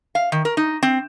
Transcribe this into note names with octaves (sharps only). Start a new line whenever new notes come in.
F5
D#3
A#4
D#4
C4